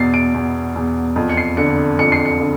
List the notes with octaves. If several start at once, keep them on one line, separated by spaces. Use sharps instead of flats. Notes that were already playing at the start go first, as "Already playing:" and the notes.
Already playing: E2 B2 A6 C7
D7
E2
E2
F2
C#7
C7
D3 C#7
F2 C#7
C7
C#7
D3